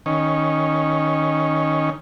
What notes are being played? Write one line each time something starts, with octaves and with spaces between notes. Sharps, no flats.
D#3 C#4